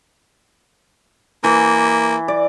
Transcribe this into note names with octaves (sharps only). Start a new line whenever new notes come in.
E3 A#3
D5